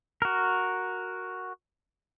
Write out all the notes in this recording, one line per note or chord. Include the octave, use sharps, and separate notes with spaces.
F#4 A#4